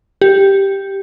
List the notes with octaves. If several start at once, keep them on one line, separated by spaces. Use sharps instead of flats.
G4